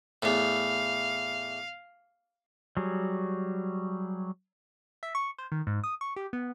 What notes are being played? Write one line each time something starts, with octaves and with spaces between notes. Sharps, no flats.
E2 A2 F5
F#3 G3 G#4
E5
C#6
C5
D#3
G#2
D#6
C#6
G4
B3